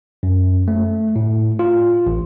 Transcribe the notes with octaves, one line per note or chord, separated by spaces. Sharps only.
F#2
A3
A2
F4
A1